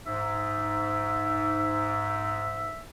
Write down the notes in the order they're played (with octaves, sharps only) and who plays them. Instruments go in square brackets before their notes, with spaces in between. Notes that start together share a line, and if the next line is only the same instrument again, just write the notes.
[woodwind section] G#2 [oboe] E5